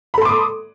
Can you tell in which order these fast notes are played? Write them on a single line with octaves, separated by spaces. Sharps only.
B5 A4 C6 D6 D#6